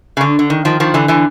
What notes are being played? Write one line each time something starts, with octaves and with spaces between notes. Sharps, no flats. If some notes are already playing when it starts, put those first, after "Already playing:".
C#3
D3
D3
D#3
D#3 F3
D#3 F3
D3 E3
D3 E3